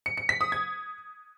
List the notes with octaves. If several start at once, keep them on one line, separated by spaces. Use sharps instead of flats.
C#7
C#7
B6
D#6
G#6